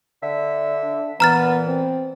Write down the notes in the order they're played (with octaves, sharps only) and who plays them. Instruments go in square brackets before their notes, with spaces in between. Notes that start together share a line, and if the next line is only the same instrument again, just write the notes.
[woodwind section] D3 E5
[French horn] D4
[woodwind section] A#2 E3 [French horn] B3 [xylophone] A#5 F6 A6
[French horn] C4